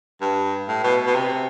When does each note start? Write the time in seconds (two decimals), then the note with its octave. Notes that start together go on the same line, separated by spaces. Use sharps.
0.21 G2
0.68 A2
0.84 B2
1.06 B2
1.15 C3